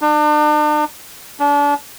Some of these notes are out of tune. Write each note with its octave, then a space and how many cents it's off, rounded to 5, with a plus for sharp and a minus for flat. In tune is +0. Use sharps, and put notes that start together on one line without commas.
D4 +40
D4 -30